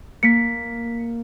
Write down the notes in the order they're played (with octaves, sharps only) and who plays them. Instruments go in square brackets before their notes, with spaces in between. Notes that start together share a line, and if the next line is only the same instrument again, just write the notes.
[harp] A#3 [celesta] B6 C#7